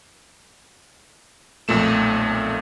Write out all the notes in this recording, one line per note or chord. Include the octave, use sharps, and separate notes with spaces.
B1 F2 A#2 A3 E7